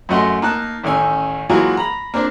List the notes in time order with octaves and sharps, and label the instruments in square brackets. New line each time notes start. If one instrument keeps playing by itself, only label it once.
[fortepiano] F#2 F#3 A3 D#5 F#5 C6
A#3 D#4 A5 F#6
A1 D#3 C#4 G#5 E6
E3 F#3 G#3 A#3 F4 F#4
A#5 B5
A#3 C4 D4